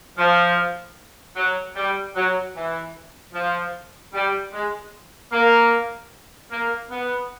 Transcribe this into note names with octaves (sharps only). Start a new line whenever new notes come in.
F3
F#3
G3
F#3
E3
F3
G3
G#3
A#3
A#3
B3